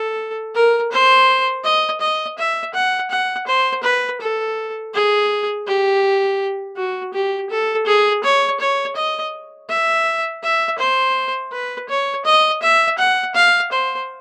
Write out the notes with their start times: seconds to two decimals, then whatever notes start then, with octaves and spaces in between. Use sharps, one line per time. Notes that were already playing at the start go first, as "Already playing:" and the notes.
Already playing: A4
0.55 A#4
0.92 C5
1.64 D#5
2.01 D#5
2.38 E5
2.74 F#5
3.11 F#5
3.47 C5
3.83 B4
4.20 A4
4.94 G#4
5.67 G4
6.77 F#4
7.14 G4
7.50 A4
7.86 G#4
8.24 C#5
8.60 C#5
8.96 D#5
9.69 E5
10.43 E5
10.78 C5
11.52 B4
11.88 C#5
12.25 D#5
12.62 E5
12.98 F#5
13.35 F5
13.72 C5